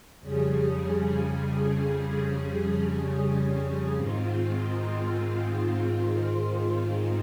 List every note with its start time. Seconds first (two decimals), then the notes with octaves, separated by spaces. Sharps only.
0.20 F2 C#3 G3 C#4 G#4
3.94 G#2 D#3 G#3 C4 F4